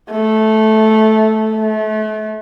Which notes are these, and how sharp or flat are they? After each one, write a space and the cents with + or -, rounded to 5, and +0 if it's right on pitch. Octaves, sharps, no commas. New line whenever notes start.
A3 -10
A3 -35